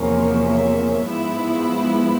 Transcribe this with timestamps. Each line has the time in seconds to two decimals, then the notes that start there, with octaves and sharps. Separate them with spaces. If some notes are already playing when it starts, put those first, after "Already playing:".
Already playing: E2 C3 F3 A#3 C#4
0.30 E5
1.05 G#2 F3 G#3 B3 E4